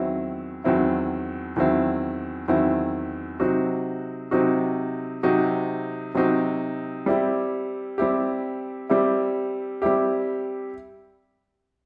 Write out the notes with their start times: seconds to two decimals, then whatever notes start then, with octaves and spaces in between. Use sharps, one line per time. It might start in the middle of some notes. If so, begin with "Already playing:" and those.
Already playing: E2 D#3 F#3 C4 E4
0.64 E2 D#3 F#3 C4 E4
1.56 E2 D#3 F#3 C4 E4
2.48 E2 D#3 F#3 C4 E4
3.40 C3 F#3 C4 D#4 F#4
4.31 C3 F#3 C4 D#4 F#4
5.23 C3 F#3 C4 D#4 F#4
6.14 C3 F#3 C4 D#4 F#4
7.06 G3 C4 E4 G4
7.98 G3 C4 E4 G4
8.90 G3 C4 E4 G4
9.82 G3 C4 E4 G4